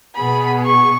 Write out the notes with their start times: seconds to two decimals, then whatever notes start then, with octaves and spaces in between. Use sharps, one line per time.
0.15 B2 B3 G#4 B5
0.65 C#6